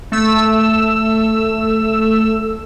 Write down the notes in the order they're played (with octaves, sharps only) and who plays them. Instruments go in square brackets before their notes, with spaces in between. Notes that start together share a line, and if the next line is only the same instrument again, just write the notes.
[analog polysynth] A3 E6